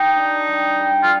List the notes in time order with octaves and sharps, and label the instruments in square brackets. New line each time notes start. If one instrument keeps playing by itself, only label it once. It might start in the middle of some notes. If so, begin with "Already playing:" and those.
Already playing: [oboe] D#4 [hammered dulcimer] G4
[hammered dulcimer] D4
G3
G3
[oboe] F4